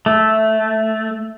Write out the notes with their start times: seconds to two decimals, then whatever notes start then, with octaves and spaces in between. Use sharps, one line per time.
0.06 A3